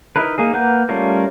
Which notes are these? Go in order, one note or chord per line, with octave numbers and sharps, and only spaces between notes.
D#4 E4 A#4 B4
A#3 D#4 G#4
A#3 B4 F#5 A#5 G6
G3 A3 C#4 F4 A#4